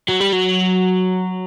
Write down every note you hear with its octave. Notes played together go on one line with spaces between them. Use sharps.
F#3
G3
F#3